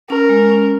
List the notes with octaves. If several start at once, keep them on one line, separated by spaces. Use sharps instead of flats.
C#4 A#4
G#3
C#4